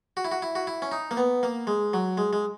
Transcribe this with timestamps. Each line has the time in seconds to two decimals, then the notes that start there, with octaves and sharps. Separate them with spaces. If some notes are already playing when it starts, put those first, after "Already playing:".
0.17 F#4
0.25 E4
0.32 F#4
0.42 E4
0.55 F#4
0.67 E4
0.82 C#4
0.92 D#4
1.11 A#3
1.17 B3
1.43 A#3
1.67 G#3
1.94 F#3
2.18 G#3
2.33 G#3